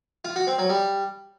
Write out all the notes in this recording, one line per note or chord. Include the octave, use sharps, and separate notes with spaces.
F4
F#4
C4
F#3
G3